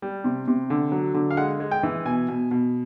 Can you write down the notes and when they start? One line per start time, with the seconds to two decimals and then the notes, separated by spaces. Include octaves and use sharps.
0.02 G3
0.24 C3
0.48 C3
0.70 D3
0.92 F#3
1.14 D3
1.31 F5
1.37 G#3 F#5
1.60 G#3
1.71 G5
1.83 E3
2.06 B2 G#5
2.28 B2
2.51 B2